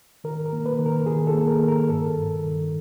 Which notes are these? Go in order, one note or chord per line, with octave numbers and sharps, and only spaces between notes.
D#3 A#4
A#4
A#3
B4
D#3
A#4
D#3 G#4
A4
A#3
A#4
D#3
A#4
G2 A4
G2
D#3